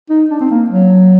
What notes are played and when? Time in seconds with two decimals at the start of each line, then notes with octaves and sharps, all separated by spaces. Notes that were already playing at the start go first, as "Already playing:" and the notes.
0.10 D#4
0.31 D4
0.41 C4
0.51 A#3
0.70 F#3